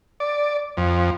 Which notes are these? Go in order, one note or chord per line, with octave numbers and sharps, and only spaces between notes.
D5
F2